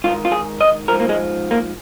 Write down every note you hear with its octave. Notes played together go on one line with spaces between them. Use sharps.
G#2 D#3 F4
F4
G#4
D#5
G#2 F3 A#4
A#3
G#3
A#3